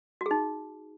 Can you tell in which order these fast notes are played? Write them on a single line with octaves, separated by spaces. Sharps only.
F#4 G#4 D#4